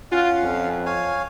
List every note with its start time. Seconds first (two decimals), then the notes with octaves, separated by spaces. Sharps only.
0.12 C#4 F4 F5 F#5
0.42 F2
0.86 C#5 F5 G#5